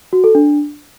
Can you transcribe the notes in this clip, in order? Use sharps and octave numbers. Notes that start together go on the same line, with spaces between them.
F#4
A4
D4